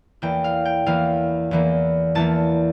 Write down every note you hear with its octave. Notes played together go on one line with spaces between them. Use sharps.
E2 E3 A#3 G5
F5
G5
E2 E3 A#3 F5
E2 E3 A#3
E2 E3 A#3 A5